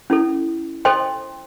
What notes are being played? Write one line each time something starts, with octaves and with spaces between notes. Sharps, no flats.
C#4 E4 A4
A4 C5 D#5 G5 C6